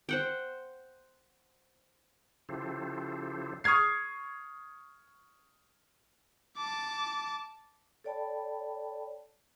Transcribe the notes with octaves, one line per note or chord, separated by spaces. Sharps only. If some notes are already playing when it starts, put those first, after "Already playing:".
C5 F#5 G5
C#3 F3 E4 G4 A4 C5
C#6 D#6 F6 G#6 C7
A5 D6
A4 C#5 D5 G5 A5 B5